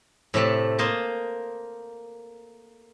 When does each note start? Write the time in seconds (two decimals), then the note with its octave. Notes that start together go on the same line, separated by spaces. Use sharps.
0.34 A2 C3 A3 D5
0.79 A#3 C5 D#5 A5